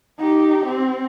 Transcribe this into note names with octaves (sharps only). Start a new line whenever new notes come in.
D#4 G4
C4